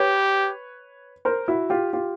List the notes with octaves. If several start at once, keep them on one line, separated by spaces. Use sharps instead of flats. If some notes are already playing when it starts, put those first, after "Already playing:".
Already playing: G4 B4 C#5
A#4 C5
E4 F#4
F4 G4
F4 G4